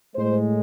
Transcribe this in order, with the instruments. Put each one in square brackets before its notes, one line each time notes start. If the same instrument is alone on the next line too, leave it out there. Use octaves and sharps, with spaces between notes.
[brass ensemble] A2 G#3 C5